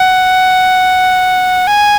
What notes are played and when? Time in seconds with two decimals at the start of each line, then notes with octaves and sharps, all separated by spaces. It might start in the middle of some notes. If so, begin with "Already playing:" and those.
Already playing: F#5
1.67 G#5